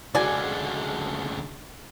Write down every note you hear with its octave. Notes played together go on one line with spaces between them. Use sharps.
C#2 D3 F#4 G#4 D5 G#5